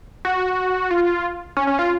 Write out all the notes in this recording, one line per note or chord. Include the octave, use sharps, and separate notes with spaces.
F#4
F4
C#4
C#4
F4